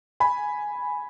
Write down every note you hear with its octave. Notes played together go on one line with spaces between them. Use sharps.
G#5 B5